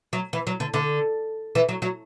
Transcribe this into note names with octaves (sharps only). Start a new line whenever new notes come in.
F#3
E3
F#3
D3
D3
E3
F#3
F#3